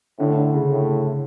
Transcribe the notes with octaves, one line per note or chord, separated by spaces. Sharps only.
A2 D3
D3
C#3
A2